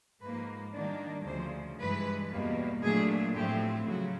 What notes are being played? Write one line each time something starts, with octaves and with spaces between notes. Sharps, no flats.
G#2 F3 A#3 B4
D#3 G3 A#3 D4
D2 C#3 F3 C5
G2 E3 G#3 B4
E2 B2 G3 A#3
A#2 F#3 A3 D4 G#4
A2 F3 A3 C4 G4
C#3 F#3 F#4